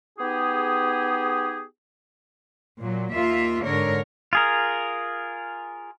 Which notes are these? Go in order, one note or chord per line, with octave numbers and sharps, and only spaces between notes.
B3 D#4 G4 G#4
A#2 F#3
D#2 A#3 F4 E5
G#2 D3 A#4 C#5
F4 G#4 A#4